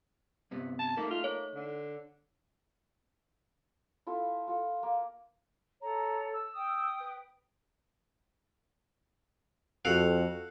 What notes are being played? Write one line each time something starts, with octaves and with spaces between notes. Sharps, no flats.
G2 C3 B3
A5
A3 A#3 D#4
F4
A#3 C#5
D3
E4 F4 A4
F4 A4
A#3
A4 C#5 A#5
E6
G5 D#6
B4
F2 F#4 A4 F5 F#5